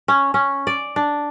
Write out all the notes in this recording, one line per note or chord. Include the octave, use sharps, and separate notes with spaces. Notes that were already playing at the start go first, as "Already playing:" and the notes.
C#4
C#4
D5
D4